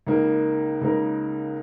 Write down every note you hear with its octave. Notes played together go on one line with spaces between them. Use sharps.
C#2 C#3 A#3 D#4 A#4
C#2 C#3 A#3 D#4 A#4